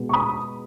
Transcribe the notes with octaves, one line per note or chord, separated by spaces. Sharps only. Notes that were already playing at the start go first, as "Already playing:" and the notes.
Already playing: B2 G#3 B3
C#6
B5 D#6